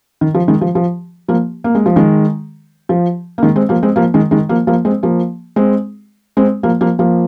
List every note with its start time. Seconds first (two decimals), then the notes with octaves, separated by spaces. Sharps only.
0.21 D#3
0.34 F3
0.48 D#3 G#3
0.61 F3
0.75 F3
1.28 F3 A#3
1.64 A#3
1.75 G#3
1.86 F3
1.96 D#3 G#3
2.89 F3
3.38 A#3
3.43 D#3 G#3
3.56 G#3 C4
3.69 F3 A#3
3.83 G#3 C4
3.96 F3 A#3
4.14 D#3 G#3
4.31 D#3 G#3
4.49 F3 A#3
4.67 F3 A#3
4.85 G#3 C4
5.03 F3 A#3
5.56 G#3 C4
6.37 G#3 C4
6.63 F3 A#3
6.81 F3 A#3
6.99 F3 A#3